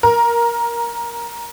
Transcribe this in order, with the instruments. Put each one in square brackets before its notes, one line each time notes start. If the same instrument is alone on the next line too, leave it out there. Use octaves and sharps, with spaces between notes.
[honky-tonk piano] A#4